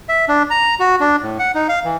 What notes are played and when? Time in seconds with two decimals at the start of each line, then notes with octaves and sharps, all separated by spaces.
0.09 E5
0.28 D4
0.50 A#5
0.80 F#4
1.00 D4
1.22 A2
1.39 F#5
1.55 D#4
1.69 F5
1.85 E3